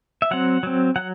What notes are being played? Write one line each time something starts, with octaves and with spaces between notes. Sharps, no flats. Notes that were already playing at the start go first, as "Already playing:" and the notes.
E5
F#3 C4 F#5
F#3 C4
F#3 F#5